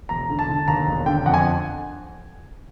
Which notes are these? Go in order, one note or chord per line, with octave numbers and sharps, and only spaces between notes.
E1 A#5
D3
A5
D3
D#2 A#5
E1
D3 G5
F2 F#5
G#5